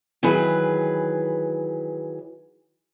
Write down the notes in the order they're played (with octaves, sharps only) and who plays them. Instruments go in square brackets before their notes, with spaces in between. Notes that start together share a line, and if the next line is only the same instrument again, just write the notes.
[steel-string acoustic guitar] D#3 E3 F#3 G#4 B4